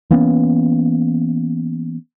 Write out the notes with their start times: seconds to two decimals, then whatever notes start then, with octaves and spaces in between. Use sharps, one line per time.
0.11 E3 A#3 B3 C#4